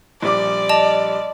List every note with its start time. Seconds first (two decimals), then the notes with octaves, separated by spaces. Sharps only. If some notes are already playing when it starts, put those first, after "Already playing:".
0.22 A#1 G3 D5 D6
0.69 D#5 A5 F7